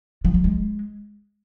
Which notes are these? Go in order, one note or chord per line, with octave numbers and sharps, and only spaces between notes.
F3
F#3
G#3